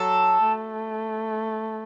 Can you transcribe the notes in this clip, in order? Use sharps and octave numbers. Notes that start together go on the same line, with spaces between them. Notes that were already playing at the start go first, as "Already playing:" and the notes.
Already playing: F#3 A4
A3